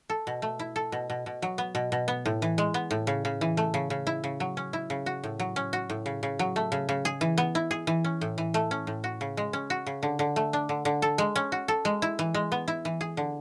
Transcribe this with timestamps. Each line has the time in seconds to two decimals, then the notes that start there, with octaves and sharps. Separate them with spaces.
0.10 A4
0.27 B2
0.42 A3
0.59 E4
0.76 A4
0.92 B2
1.10 B2
1.26 B2
1.42 F#3
1.58 B3
1.75 B2
1.92 B2
2.08 B3
2.26 A2
2.42 E3
2.58 G#3
2.74 B3
2.91 A2
3.07 C#3
3.25 C#3
3.41 E3
3.57 A3
3.74 C#3
3.90 C#3
4.07 E4
4.24 C#3
4.40 F#3
4.57 C#4
4.73 E4
4.90 C#3
5.06 F#4
5.24 A2
5.39 F#3
5.56 C#4
5.73 F#4
5.90 A2
6.06 C#3
6.23 C#3
6.39 F#3
6.56 A3
6.72 C#3
6.89 C#3
7.05 G#4
7.21 E3
7.38 B3
7.55 E4
7.71 G#4
7.87 E3
8.04 C#4
8.21 A2
8.38 E3
8.54 A3
8.71 C#4
8.87 A2
9.04 F#4
9.21 C#3
9.37 G#3
9.53 C#4
9.70 F#4
9.87 C#3
10.03 D3
10.19 D3
10.36 A3
10.53 D4
10.69 D3
10.85 D3
11.02 A4
11.18 G#3
11.36 C#4
11.52 F#4
11.68 A4
11.85 G#3
12.02 E4
12.19 E3
12.34 G#3
12.52 B3
12.68 E4
12.85 E3
13.01 G#4
13.17 D3